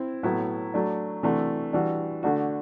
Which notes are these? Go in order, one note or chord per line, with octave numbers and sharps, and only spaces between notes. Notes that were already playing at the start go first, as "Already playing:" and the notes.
Already playing: C4 E4
A2 F#3 B3 E4
F#3 A3 D4
C3 E3 A3 D4 F#4
E3 G3 D4 F#4
D3 A3 D4 F#4